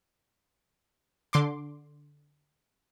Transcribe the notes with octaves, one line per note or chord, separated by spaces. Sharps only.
D3 C6 D6